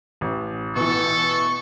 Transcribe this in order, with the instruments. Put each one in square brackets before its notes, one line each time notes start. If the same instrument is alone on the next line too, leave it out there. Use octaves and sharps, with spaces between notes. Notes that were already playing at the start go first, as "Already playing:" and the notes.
[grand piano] A1
[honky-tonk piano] B2 E3 [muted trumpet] A4 [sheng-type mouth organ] C#6